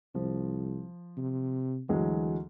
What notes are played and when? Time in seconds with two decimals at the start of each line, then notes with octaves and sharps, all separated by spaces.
0.15 C2 F3
1.17 C3
1.89 D2 E3 F#3 G#3